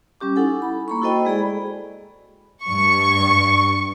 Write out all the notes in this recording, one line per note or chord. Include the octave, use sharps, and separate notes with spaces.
G3 C#4 G4 D6
D#4 E4 A4 F#5 G#5
B5
A#3 B5 C#6
E4 F#4 A4 C5 D#5 G5
G#3 G#4 D5 B5
G2 C#6